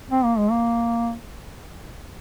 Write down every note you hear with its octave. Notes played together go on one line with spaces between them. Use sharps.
C4
A#3
G#3
A#3